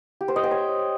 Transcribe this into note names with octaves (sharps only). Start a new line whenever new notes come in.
G4
C5
D#5
G5
C#5